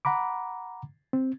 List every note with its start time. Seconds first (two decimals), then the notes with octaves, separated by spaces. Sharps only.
0.05 F#5 A#5 B5 D6
1.13 C4